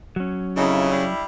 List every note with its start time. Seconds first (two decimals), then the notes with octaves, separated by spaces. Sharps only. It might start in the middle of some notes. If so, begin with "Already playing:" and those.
0.16 F#3 C#4
0.57 F2 C#3 D#4 E4
0.92 G3 D4 E4